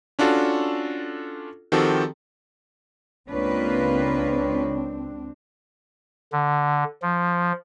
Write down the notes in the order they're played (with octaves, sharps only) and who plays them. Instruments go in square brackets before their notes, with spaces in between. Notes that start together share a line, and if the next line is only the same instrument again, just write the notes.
[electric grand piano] C#4 D4 F4 F#4 A4
D#3 F3 C4 F#4 G4 A4
[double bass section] C#2 C4 [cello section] A#3 F4 B4 [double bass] D4 [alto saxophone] C#5
[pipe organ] D3
F3